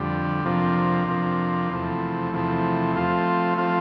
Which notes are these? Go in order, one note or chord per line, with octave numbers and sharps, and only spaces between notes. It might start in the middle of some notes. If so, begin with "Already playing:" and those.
Already playing: F2 D3 G3
F2 C3 F3 A#3 D4
F2 C3 F3 A#3 D4
E2 C3 F3 A3
E2 C3 F3 A3
F3 A3 C4 F4
F3 A3 C4 F4